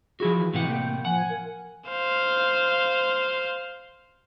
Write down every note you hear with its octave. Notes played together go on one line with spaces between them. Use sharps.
F3 E4 F#4 G#4
E3
A2 C3 E3 F#5 G5
A#3
F3 F#5 G#5
A#4
C5 F5